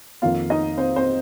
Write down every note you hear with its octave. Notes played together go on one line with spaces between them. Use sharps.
F2 D#3 A#3 F4 F5
D#4 D#5
C4 C5
C4 C5